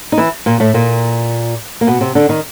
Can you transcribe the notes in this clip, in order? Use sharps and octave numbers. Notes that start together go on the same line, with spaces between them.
D#4
E3 E4
A#2 A#3
A2 A3
A#2 A#3
A#3
B2 B3
C3 C4
D3 D4
D#3 D#4